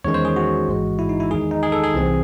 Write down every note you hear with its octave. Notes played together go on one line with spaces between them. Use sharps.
E2 D#3 G#3 C#4 C#5
C5
G#4
F#4
A1 G#2 E3 G#3
E4
D#4
E4
E2 D#3 G#3 D#4 G#4
D#4
G#4
A4
G#4
C2 C3 E3 C4